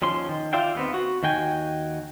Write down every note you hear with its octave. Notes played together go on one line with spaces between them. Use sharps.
D#2 F3 C#4 C6
D#3
F4 D5 E5 F5 G5
D#2 B3 C4
F#4
D#2 D#3 F#4 G5 G#5